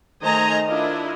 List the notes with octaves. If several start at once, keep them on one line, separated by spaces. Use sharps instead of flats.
D#3 A3 C5 D#5 G#5 A#5
D4 E4 F4 A#4 D#5